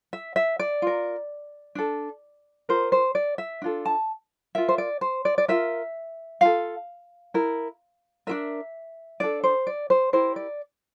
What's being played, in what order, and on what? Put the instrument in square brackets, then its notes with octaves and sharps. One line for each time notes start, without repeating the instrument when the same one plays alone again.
[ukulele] E5
E5
D5
F4 A#4
D4 A4
F4 A#4 C5
C5
D5
E5
D4 F4 A4
A5
F4 A#4 E5
C5
D5
C5
D5
D5
F4 A#4 E5
F4 A4 F5
E4 A#4
D4 F4 A#4 E5
D4 A4 D5
C5
D5
C5
E4 G4 A#4 C5
D5